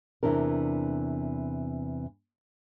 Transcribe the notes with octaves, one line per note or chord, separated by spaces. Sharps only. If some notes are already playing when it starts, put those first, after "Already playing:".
E2 C3 E3 D4 A#4